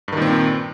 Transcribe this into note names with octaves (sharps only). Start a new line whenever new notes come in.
G2 A#2 D#3 C4